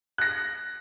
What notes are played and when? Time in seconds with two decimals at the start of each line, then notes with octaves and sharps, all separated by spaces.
0.18 F#6 A#6